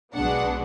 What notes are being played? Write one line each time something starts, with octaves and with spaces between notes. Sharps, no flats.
B1 B2 G#3 B3 D4 F#5